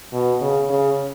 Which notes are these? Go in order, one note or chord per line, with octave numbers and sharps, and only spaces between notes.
B2
C#3
C#3